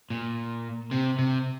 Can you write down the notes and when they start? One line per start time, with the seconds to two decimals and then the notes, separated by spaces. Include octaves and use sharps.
0.10 A#2
0.91 C3
1.19 C3